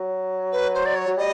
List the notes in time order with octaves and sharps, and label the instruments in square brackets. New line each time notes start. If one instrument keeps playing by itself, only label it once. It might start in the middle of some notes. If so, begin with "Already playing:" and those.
Already playing: [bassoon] F#3
[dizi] B4
C5
D5
C#5
[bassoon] F#3
[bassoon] G3 [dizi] D#5